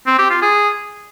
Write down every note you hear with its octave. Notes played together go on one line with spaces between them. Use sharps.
C4
G4
F4
G#4